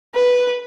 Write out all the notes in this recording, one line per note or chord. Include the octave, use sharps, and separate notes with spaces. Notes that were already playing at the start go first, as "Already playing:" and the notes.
B4